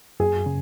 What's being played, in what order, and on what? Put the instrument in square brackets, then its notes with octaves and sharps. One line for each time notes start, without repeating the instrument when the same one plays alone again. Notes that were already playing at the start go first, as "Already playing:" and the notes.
[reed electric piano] F#2 [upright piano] G#4
[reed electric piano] C#3